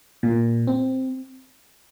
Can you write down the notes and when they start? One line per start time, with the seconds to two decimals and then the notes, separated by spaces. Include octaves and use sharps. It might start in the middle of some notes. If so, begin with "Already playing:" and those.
0.23 A#2
0.67 C4